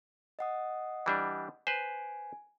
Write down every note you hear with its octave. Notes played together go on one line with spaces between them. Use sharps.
D#5 F#5 D#6
E3 G3 D4
B4 C5 G#5